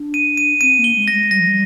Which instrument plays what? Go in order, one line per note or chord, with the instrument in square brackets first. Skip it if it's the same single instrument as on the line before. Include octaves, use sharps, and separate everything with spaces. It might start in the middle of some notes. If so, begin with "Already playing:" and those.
Already playing: [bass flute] D4
[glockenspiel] D#7
D#7
[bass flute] C4 [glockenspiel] D#7
[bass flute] A#3
[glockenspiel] G7
[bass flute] G#3
[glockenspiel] A#6
[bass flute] G#3
[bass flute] G3 [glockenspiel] A#6
[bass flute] F3
G3